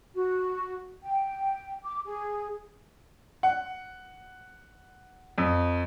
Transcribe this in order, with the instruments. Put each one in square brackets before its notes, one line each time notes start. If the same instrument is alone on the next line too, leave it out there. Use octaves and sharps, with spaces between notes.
[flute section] F#4
G5
D6
G#4
[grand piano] F#5
F2